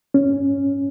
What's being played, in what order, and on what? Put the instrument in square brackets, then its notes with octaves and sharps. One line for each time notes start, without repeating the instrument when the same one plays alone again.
[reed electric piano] C#4